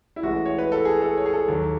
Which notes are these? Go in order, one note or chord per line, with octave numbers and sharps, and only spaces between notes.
E4
A1 A2 E3 G#3 F#4
C#5
B4
A4
G#4
A4
C#5
G#4
A4
D#2 D#3 F#3